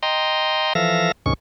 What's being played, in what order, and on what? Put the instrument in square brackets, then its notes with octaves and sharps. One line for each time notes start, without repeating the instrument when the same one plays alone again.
[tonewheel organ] D#5 G5 A#5 C6
E3 F3 A4 E5 F5 A#6
D2 G#2 C3 D#3 C#4 C#6